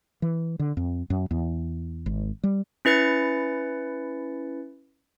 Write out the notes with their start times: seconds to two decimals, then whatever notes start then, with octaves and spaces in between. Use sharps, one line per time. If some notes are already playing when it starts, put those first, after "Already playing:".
0.22 E3
0.59 D3
0.77 F2
1.10 F#2
1.31 E2
2.06 G#1
2.44 G3
2.85 C#4 E4 B4 A6 C#7